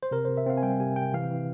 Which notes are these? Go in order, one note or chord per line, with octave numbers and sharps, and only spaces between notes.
C5
C3 A#4
C3 C5
E5
C4 F5
G#5
G3 G5
C3 G#5
C3 G5
E3 F5
E3